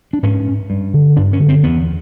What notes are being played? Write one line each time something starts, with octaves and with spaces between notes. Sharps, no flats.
D4
G#2 C#4
G2
D3
G2 D4
C#4
D3
C4
E2 B3